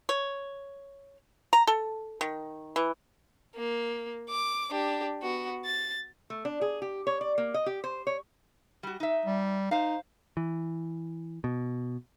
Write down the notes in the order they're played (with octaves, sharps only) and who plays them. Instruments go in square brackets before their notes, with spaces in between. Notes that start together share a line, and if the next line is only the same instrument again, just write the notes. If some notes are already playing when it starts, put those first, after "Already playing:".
[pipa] C#5
A#5
A4
D#3
E3
[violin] A#3
D6
D4 G4
B3 F#4
A6
[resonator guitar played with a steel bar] A3
D4
G#4
G4
C#5
D5
A#3
D#5
G4
C5
C#5
G3 F#4
D#4 E5
[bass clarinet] G3
[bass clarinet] D#4 [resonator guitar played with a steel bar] C5 F5
[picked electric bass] E3
B2